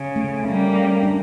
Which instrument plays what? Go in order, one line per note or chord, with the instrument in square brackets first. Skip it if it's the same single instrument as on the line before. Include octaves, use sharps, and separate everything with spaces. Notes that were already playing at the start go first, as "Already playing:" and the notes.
Already playing: [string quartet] C#3
[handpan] A3
[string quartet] G3 A#3 [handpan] C#4
[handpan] C#4
D4